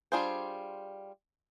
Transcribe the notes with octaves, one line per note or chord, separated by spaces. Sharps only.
G3 D4 F4 G#4 C5